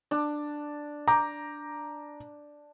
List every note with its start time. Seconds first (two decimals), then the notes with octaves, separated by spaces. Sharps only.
0.11 D4
1.08 A#5 D6 G6